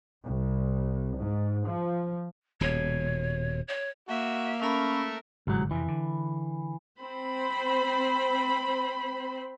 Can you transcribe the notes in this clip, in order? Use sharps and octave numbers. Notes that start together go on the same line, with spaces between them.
C2
G#2
F3
D#1 B2 C#5
C#5
A#3 F#4 E5
A3 C#4 A#4 E5 B5
G1 C2 G#2 F#3
F2 C3 E3
D3
C4 C5 B5